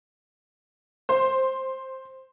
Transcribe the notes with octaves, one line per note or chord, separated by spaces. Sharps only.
C5